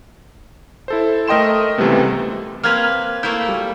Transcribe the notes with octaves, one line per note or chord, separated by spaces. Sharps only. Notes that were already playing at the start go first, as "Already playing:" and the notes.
E4 A4 C5
A3 A#4 D#5 G5 C6 E7
C#2 C3 E3 G3 A3 B3
A#3 C4 B4 F6 G#6 F7
A3 A#3 E4 G6
G3